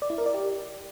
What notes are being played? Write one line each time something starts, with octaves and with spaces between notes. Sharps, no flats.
D5
E4
A#4
D5
G4